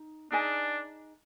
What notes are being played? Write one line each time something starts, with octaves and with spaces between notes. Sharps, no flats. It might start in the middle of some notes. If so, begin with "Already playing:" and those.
Already playing: D#4
D4 D#4 G#4 D#5 G#5